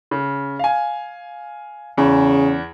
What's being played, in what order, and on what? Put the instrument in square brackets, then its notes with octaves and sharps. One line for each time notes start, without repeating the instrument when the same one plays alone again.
[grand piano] C#3
F5 G#5
[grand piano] E2 [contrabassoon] C#3